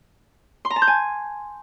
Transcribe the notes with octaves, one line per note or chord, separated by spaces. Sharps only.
C6
A#5
A5
G6
G#5